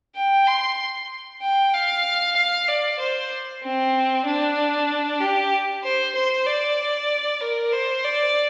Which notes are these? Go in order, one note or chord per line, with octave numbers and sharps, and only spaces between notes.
G5
C6
G5
F5
F5
D5
C5
C4
D4
G4
C5
C5
D5
A#4
C5
D5